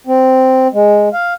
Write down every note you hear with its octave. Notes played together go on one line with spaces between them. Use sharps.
C4
G#3
F5